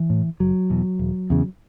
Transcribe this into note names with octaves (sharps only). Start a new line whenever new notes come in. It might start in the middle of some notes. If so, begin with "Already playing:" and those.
Already playing: E3
A2
F#1 F#3
E2 B2
E1
E2 C#3